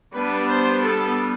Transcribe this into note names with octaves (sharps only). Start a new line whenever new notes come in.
G3 B3 D4 B4
C5
A4